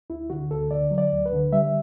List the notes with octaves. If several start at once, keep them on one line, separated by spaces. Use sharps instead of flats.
D2 E4
D3 F#4
D2 A4
D3 D5
F#3
D5
D2
B4
D3
G3 E5